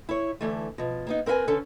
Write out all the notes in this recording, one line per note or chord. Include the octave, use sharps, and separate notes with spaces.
E4 C#5
D3 E3 A3
B2 F3
A#3 B3 D#4
C4 A#4 B4 F5 G#5
D3 C#4 A4